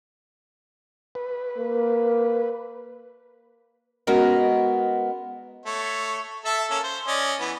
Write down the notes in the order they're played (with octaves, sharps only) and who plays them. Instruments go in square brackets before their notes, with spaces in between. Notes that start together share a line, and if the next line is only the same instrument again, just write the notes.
[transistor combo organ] B4
[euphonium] A#3
[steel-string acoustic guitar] G#3 B3 C#4 F#4 A#4 D#5
[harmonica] A3 C#5
A4 E5 A5
A#3 C#4 A4
C5
C#4 D5 D#5
E3 B3